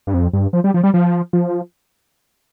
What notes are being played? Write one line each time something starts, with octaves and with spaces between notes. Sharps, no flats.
G2
F2
G2
F3
G3
F3
G3
F3
F3